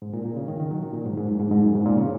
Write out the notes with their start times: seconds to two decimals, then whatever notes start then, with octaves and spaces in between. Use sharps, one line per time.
0.02 G#2
0.13 A#2
0.25 A#2
0.37 C#3
0.48 D#3
0.59 D#3
0.71 F#3
0.83 D#3
0.94 A#2
1.06 G#2
1.17 G#2
1.28 F#2
1.40 G#2
1.51 G#2
1.63 F#2
1.75 G#2
1.86 A#2
1.97 C#3